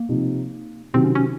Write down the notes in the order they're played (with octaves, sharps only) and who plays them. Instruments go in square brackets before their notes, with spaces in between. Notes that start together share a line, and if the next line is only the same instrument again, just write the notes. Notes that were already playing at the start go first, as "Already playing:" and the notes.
Already playing: [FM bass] A#3
[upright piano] C3 F3 C4 D#4
[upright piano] C3 D#3 F#3 [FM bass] C4
[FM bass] C#4
C#4